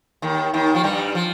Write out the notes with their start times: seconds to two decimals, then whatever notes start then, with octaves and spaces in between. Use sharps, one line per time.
0.22 D#2 D#3
0.53 D#2 D#3
0.75 F3
0.84 G2 G3
1.15 F3